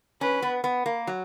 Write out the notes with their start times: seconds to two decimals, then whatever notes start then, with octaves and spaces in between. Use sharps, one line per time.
0.21 C#4 B4
0.42 B3
0.64 B3
0.86 A#3
1.07 F#3